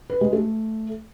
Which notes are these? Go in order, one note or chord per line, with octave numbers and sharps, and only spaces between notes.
B4
G#3
A3